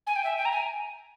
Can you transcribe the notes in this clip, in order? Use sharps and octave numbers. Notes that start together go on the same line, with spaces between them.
G#5
G5
E5
G5
A#5
G#5